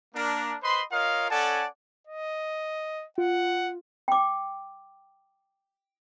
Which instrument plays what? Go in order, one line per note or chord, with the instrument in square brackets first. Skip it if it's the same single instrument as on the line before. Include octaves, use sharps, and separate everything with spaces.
[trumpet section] A#3 D4 A#4
B4 C5 D#5 B5 C6
F4 A#4 C#5 D#5 F5
C#4 A4 D5 F#5 G#5 A5
[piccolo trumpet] D#5
[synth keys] F4 [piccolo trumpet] F#5
[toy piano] G5 D6